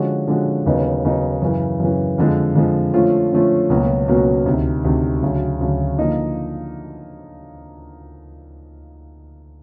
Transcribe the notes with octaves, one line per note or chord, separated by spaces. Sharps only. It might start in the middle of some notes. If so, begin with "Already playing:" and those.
Already playing: D3 F3 G#3 C#4 F#4
D3 F3 G#3 C#4 F#4
D#2 C#3 F#3 B3 D#4
D#2 C#3 F#3 B3 D#4
F#2 C#3 E3
F#2 C#3 E3
F2 D3 F3 G#3
F2 D3 F3 G#3
D3 F3 A3 C#4 F4
D3 F3 A3 C#4 F4
C#2 B2 F#3 A#3 C#4
C#2 B2 F#3 A#3 C#4
D2 C3 D#3
D2 C3 D#3
D2 C#3 F#3
D2 C#3 F#3
D3 F3 A#3 D#4